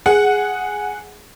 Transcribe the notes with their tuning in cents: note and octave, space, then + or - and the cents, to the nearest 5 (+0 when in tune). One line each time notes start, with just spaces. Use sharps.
G#4 +0 F#5 +0